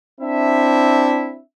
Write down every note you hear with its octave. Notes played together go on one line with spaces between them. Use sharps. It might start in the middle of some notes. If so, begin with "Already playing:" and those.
C4 D4 E4 E5